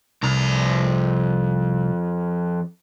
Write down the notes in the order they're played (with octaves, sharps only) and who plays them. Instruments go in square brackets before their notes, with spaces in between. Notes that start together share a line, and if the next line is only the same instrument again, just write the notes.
[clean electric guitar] C2 [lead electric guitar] F2 A#5